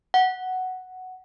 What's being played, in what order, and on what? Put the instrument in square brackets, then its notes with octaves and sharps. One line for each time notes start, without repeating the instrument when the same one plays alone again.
[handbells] F#5